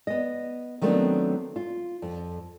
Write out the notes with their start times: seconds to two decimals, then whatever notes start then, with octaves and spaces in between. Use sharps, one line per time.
0.07 B3 D#5
0.81 D#3 F#3 A3 B3 C4 D4
1.56 F4
2.02 F2